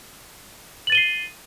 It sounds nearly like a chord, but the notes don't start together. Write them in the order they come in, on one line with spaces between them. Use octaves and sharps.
F#7 A6 D#7 G7 C7